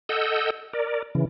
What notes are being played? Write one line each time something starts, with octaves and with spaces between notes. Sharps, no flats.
A4 D#5 F#5 E6 G6
A#4 D5
C#3 E3